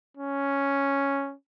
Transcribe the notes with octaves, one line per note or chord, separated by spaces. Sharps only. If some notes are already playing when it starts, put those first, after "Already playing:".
C#4